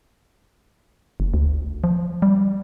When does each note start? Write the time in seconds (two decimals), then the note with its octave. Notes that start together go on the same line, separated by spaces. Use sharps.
1.20 F#1
1.34 D2
1.84 F3
2.22 G3